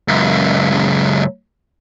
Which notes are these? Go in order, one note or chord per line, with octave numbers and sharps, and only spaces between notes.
C#2 F#2